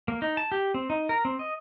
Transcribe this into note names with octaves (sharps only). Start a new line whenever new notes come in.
A#3
D#4
A5
G4
C4
D#4
A#4
C4
D#5